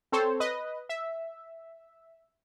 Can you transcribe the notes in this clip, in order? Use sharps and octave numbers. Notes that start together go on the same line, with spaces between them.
C4 A4 C5 C#5
B4 D#5
E5